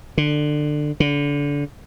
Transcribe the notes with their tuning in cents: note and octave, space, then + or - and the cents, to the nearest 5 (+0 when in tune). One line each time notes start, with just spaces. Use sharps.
D3 +20
D3 -30